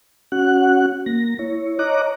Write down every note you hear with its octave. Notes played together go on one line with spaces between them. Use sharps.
C#4 F#4 F#5 F#6
A#3 A#6
E4 C#5
C#5 D#5 A#5 D6 F#6